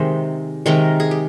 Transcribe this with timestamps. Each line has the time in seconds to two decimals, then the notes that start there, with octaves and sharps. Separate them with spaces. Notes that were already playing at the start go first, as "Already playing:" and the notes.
Already playing: C3 D#3 G#3 C5
0.66 C3 D#3 G#3 A#4
1.00 G#4
1.11 G4